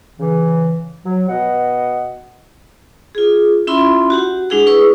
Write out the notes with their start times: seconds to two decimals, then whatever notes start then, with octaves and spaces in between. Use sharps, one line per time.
0.19 C#3 E3
1.05 F#3
1.29 B2 D#5 F#5
3.15 F4 G#4
3.67 C#4 E4 F4 E5 B5 C6
4.10 F#4 G4 F#5
4.50 G#3 D4 E4 G#4 F#5
4.66 E4 G#4 B4 C#6 D#6 E6